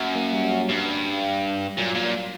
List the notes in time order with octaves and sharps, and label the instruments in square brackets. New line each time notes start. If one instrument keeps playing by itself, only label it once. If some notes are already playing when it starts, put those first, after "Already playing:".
Already playing: [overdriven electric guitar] F#2 [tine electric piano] A#3 C#4
[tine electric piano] F#3 A#3
G3
G3
F#3
[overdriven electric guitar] G2 [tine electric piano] G3
[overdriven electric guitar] A#2 [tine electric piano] F#3
[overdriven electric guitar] A#2